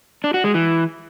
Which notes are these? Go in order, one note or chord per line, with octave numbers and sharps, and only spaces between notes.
D4
F#4
G#3
E3